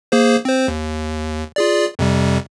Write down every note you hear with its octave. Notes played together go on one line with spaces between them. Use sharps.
A#3 G#4 C5
C4 C5
D#2
F4 G#4 D5
F2 C3 G3